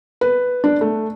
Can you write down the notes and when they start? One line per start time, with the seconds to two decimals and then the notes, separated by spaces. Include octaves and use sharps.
0.21 B4
0.64 D4
0.81 A3